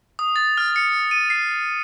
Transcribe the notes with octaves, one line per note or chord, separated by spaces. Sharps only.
D#6
A6
F6
C#7
D#7
C7